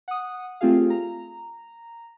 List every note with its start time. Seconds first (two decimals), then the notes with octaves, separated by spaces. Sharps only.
0.08 F#5 D#6
0.61 A3 C4 F4 G4 G#4 F5
0.90 A#5